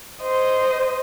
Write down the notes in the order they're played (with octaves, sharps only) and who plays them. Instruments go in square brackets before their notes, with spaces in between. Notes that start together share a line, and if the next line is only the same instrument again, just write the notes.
[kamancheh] C5 D#5